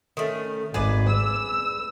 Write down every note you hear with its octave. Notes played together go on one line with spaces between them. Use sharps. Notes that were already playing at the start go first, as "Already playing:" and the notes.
D#3 A3 C#4
G#1 G#4 B4 D5
E6